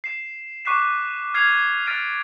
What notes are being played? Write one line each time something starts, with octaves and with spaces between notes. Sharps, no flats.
C7 E7
C#6 D6 F#6 B6 C7 E7
F6 G#6 C7 D#7 F7
F6 A6 B6 D7 D#7 F7